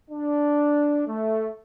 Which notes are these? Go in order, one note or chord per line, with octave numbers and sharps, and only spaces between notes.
D4
A3